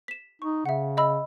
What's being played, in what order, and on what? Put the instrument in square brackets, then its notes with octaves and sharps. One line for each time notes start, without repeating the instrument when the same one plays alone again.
[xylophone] B6 E7
[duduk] D#4 [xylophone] C#6
[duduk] C#3 [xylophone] E5 F#5
[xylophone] D#5 B5 E6